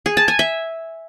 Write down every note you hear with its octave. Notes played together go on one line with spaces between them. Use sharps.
G#4
A5
G#5
E5